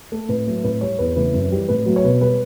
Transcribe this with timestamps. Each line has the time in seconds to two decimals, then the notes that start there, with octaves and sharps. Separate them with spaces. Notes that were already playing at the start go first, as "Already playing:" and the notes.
0.12 A3 A4
0.29 A2 B4
0.47 F#3 A3
0.64 A2 B4
0.81 G3 C#5
0.99 E2 B4
1.16 C#3 E3 A3 B4
1.34 F#2
1.52 E3 G3
1.69 A2 B4
1.86 F#3 A3
1.96 C#5
2.04 B2 B4
2.21 G3 B4